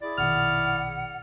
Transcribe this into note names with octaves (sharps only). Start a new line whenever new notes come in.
E4 G#4 D5
A#1 B2 D#3 F#5 F6